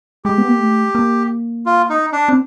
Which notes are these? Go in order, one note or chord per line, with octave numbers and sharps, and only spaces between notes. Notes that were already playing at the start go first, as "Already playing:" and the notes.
G#3 G4
B3
A#3
A3
A#3
F4
D#4
D4
C4